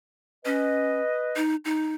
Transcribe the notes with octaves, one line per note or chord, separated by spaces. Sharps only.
C#4 B4 D#5
D#4
D#4